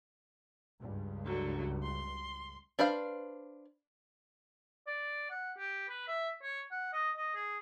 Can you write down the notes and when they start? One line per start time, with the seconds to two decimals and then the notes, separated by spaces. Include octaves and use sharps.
0.80 C#2 G2
1.25 D3 F#3
1.83 C6
2.79 D4 B4 C5 F5
4.87 D5
5.30 F#5
5.58 G4
5.89 B4
6.08 E5
6.43 C#5
6.71 F#5
6.93 D#5
7.16 D#5
7.35 G#4